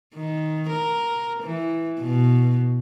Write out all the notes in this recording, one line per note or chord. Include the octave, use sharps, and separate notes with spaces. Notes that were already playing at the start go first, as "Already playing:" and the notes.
D#3
A#4
E3
B2